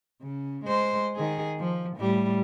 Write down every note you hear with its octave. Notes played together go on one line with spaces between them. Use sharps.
C#3
G#3 C5
D#3 G#4
F3
A2 G3